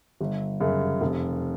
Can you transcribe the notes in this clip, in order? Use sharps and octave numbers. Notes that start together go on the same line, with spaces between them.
G1
F#2 C#3
F1